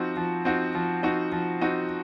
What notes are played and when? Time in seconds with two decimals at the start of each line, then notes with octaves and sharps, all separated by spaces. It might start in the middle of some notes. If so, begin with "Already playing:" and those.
Already playing: F3 C4 D#4 F#4
0.17 F3
0.45 C4 D#4 F#4
0.75 F3
1.03 C4 D#4 F#4
1.32 F3
1.61 C4 D#4 F#4